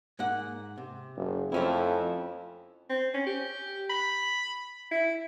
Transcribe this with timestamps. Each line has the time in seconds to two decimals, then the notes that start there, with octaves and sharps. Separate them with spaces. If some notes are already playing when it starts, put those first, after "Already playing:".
0.19 G#2 A#3 F#5
0.77 C3
1.16 F#1
1.52 F2 A3 C#4 E4
2.89 C4
3.14 C#4
3.26 G4
3.90 B5
4.91 E4